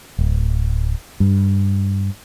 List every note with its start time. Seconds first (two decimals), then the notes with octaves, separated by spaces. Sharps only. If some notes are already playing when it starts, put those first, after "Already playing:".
0.19 D1
1.20 G2